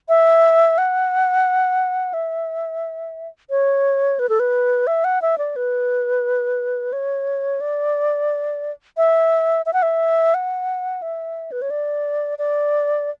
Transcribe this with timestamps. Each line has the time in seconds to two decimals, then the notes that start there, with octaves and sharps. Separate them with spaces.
0.09 E5
0.78 F#5
2.14 E5
3.50 C#5
4.19 B4
4.29 A4
4.40 B4
4.87 E5
5.04 F#5
5.22 E5
5.38 D5
5.56 B4
6.93 C#5
7.61 D5
8.97 E5
9.66 E5
9.73 F#5
9.82 E5
10.34 F#5
11.02 E5
11.52 B4
11.62 C#5
11.70 D5
12.38 D5